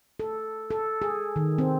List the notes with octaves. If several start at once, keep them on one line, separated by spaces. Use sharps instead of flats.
A4
A4
G#4
D#3
C4